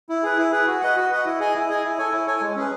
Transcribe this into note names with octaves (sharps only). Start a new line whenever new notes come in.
E4
G#4 B4
E4
G#4 B4
F#4
B4 D#5 F#5
F#4
B4 D#5 F#5
E4
G#4 D#5 G#5
E4
G#4 D#5 G#5
E4
A4 C#5 G#5
E4
A4 C#5 G#5
G#3
C#4 G#4 B4